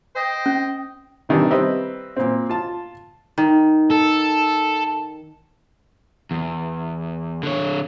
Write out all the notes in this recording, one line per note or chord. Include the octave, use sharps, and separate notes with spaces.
C5 D#5 G5
C#4
C3 D#3 E3 G3 D4
G3 C4 B4 D#5 E5
A#2 C4
F4 A5
D#3
A4
E2
D3 C#5